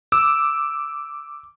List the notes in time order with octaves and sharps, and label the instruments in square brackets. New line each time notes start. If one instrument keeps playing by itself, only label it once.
[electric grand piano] D6 E6